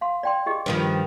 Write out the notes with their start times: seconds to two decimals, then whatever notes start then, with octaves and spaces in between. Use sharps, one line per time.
0.01 F5 C6
0.23 D5 G5 C6
0.46 G4 G#4 D#5
0.66 G2 D#3 F3